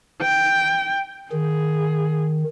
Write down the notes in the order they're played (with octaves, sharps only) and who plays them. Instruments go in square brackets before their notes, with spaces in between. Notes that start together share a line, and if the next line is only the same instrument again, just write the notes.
[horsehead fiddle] G5
[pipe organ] D#3 [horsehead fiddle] G#4